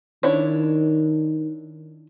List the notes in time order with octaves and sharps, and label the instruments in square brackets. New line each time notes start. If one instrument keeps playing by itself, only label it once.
[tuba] D#3 [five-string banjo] D4 E4 C#5